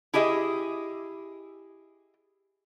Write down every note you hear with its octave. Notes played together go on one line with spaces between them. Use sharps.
E4 G4 G#4 D#5 E5